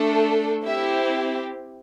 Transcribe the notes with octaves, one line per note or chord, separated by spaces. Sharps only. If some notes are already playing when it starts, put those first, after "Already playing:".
Already playing: A3 D4 A4
C4 E4 G4 E5